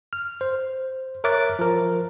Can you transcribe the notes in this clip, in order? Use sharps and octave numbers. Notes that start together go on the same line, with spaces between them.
F6
C5
A#4 C#5 E5 D6 F#6 A6
F3 A#4